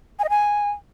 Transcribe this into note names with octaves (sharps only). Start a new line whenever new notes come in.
G#5
D#5
G#5